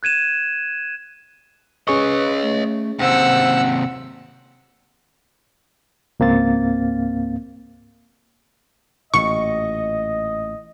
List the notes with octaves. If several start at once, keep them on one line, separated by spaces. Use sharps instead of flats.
F#6 G#6 D#7 E7
C#4 G#4 B4 C#5 D#5 C#6
A3
D#2 C3 C5 F#5 E6
C#2 G#2 A#3 C4 F5 A6
A1 A#2 D#5 C#6